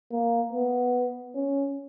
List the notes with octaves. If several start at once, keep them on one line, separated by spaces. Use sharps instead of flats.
A#3
B3
C#4